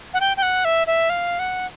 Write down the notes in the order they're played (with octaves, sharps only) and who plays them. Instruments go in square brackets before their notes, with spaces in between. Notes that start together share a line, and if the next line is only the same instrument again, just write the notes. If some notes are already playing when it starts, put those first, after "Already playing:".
[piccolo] F#5
G5
G5
F#5
E5
E5
F5
F#5